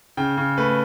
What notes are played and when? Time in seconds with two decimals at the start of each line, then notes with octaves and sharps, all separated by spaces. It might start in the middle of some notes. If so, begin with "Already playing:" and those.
0.17 C#3 G5
0.37 C#3
0.58 A3 B4